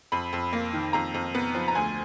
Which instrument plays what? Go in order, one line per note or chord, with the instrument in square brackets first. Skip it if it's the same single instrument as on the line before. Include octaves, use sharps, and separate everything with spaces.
[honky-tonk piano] F2 B5
F2
A#3
D#3
F2 A#5
F2
B3
F3
A#5
D2 G#5